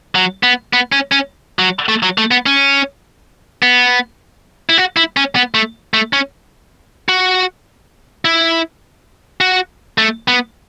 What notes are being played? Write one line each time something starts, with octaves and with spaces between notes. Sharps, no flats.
F#3
B3
B3
C#4
C#4
F#3
A3
F#3
A3
B3
C#4
B3
E4
F#4
E4
C#4
B3
A3
A3
C#4
F#4
E4
F#4
A3
B3